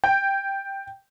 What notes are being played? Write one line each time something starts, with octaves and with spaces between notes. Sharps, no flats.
G5